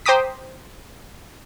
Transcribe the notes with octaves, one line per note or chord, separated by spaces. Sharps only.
C5 G5 A#5 D6 D#6 B6